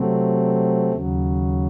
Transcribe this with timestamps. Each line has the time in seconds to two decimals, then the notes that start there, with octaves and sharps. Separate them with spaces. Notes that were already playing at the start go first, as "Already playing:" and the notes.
Already playing: C3 F#3 A3 C4
0.93 D#2 C#3 F#3